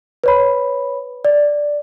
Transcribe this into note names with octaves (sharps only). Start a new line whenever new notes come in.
B4 C#5 B5
D5